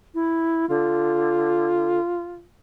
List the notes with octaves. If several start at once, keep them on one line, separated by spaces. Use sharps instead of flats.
E4
D3 F4